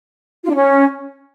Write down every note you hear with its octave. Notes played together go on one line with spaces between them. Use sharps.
F4
D4
C#4